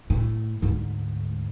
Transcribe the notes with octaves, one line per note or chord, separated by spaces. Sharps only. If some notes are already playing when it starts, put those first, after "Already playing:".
A2
D2 G#2